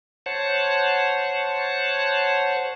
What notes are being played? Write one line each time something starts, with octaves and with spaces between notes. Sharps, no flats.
C5 C#5 F#5 A5